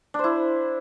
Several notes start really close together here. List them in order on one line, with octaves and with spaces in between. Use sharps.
D4 C5 E4